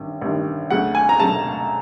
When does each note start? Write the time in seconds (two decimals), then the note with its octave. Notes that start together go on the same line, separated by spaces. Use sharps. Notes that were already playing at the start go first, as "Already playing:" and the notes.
Already playing: A1 G2 D#3
0.21 A1 G2 D#3
0.71 D2 C#3 F#3 F#5
0.95 G#5
1.09 A#5
1.19 D2 C#3 F#3 A5